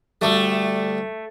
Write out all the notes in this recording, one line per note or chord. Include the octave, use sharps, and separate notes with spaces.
D2 G3 A3